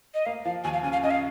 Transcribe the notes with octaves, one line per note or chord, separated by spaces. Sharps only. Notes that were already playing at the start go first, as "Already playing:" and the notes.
D#5
A#3 F5
F3 F5
D#2 G#5
F5
C#3 G#5
F5
C#3 D#5
F5